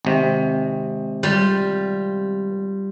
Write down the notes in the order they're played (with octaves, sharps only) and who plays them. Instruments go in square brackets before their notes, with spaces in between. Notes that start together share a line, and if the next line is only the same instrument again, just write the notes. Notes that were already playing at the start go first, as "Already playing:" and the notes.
[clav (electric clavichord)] G#1 C3
[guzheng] G3 F4